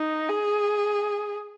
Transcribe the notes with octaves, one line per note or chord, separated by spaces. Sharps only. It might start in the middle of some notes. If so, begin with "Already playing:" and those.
Already playing: D#4
G#4